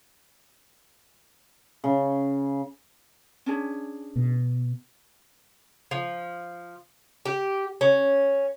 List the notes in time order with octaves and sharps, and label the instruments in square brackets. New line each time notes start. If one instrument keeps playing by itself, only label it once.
[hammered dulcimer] C#3
[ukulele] C#4 D4 G#4
[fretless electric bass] B2
[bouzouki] F3
G4
C#4